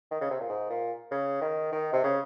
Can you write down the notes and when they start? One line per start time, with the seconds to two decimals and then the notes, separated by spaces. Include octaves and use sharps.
0.11 D#3
0.22 C#3
0.31 C3
0.41 A#2
0.49 G#2
0.70 A#2
1.12 C#3
1.42 D#3
1.72 D#3
1.93 C3
2.04 C#3